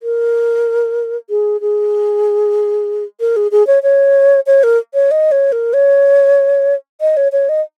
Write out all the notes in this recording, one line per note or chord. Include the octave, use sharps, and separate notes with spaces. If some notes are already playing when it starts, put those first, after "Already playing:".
A#4
G#4
G#4
A#4
G#4
G#4
C#5
C#5
C#5
A#4
C#5
D#5
C#5
A#4
C#5
D#5
C#5
C#5
D#5